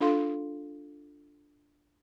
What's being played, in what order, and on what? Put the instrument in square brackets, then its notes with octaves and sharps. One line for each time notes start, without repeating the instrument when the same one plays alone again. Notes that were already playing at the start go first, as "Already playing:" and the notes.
[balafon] D4 F4 A4 F5 C6